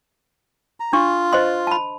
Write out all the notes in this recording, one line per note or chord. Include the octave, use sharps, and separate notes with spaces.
A#5
D4 F4 C#6
C5 D#5 C6
A5 B5